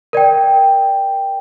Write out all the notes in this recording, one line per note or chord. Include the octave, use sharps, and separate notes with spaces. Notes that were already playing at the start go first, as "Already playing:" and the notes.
A#4 D5 G5